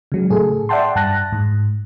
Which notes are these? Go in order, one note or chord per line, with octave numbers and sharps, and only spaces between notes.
C#3 F#3 G#3
A2 G#4 A4
D5 E5 F#5 G5 A5 C6
G2 A5 F#6 A#6
G#2